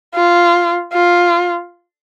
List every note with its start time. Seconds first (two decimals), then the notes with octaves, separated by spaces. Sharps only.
0.15 F4
0.93 F4